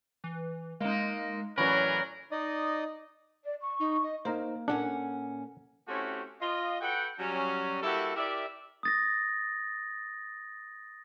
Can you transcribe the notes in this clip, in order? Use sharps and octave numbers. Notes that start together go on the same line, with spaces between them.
E3
G#3 A#3 D#4
A2 E3 F#3 C#4 A#4 D5 B5
D#4 D5 D#5 D#6
D5
C#6
D#4
D#5
A#3 D#4 A#4 C5
A#2 C#4 D4 A4 F#5
A3 C4 C#4 E4 F#4 G4
F4 D#5
F#4 A4 B4 F#5 G5
F#3 G3 C#4
G3 A#3 E4 F#4 G4 A4
E4 G4 A#4 D5 E5
D#6 A6 A#6